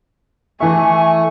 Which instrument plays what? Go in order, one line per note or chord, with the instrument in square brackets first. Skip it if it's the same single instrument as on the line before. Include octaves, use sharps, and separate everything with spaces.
[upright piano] E3 E5 [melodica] A3 C#6 [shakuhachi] G#5